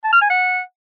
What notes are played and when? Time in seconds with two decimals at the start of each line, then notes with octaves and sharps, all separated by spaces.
0.04 A5
0.13 F6
0.21 G#5
0.30 F#5